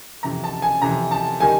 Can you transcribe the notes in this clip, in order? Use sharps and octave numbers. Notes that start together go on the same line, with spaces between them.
F2 C3 E3 A#5
A5
G#5
F2 C3 E3 A#5
A5
D#3 G3 G#5